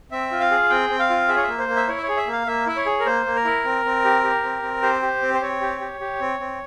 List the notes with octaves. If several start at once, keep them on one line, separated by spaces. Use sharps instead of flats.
C4 E5
F4
F5
G#4
C4 G5
C4
F5
F4
G#4 E5
C#5
E5
A#3
C5
A#3
E5
E4 C#5
E5
C#5
G#4
E5
A#3
F5
A#3 E5
E4 E5
C#5
G#4
A#4
A#3 C5
A#3
A#4
E4
C4
C4
G4
G4
C4
C4
G4 C5
G4
C4
C5
C4 C#5
G4
G4
G4
C4
C4